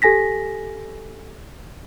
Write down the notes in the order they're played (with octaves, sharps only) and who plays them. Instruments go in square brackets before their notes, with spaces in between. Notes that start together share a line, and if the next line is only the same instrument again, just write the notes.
[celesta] G4 A4 G#5 A#6 B6